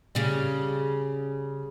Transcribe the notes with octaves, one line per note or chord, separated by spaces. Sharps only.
C#3 G3